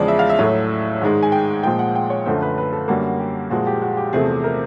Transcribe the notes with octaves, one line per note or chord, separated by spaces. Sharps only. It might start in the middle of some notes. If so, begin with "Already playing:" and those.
Already playing: E2 C#3 F3 G#3 D5
E5
F5
E5
A2 F#3 A3
G#2 D#3 G#3
G#5
G5
A#2 F3 G#3 G5
F#5
G5
C#5
F#2 D3 F3 A3 C5
B4
B4
A4
F#2 D3 G3 A#3 F#4
G4
A#2 F3 G#3 F#4
G4
F#4
G4
E2 C3 F3 A3 G#4
A#4